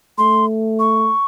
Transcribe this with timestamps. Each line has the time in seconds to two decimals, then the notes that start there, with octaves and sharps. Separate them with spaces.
0.18 A3 C6
0.79 C#6